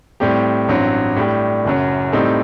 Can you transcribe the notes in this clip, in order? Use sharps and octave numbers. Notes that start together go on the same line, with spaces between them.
A2 G3 C4 G4
A1 G2 F#3 C4
A2 G3 D4 G4
F#1 F#2 F#3
A2 G3 C4 D#4 A4